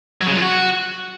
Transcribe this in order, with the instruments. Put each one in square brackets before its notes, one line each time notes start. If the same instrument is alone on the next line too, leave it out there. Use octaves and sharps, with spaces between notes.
[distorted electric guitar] F#3
C#3
F#3
F4
F#4